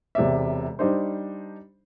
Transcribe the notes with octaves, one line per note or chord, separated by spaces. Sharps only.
E1 C3 D5 E5
G3 D4 D#4 C5